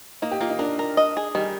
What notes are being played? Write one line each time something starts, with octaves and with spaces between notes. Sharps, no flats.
A#3 D#4
G4
A#3 F4
D#4
D4 A#4
A#4
D#5
G#4
D#3 G3